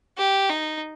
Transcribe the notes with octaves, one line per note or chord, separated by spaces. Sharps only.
G4
D#4